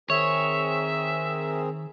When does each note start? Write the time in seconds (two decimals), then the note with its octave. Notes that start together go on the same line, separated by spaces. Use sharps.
0.10 D#3 C4 G#4 A#4 C#5 E5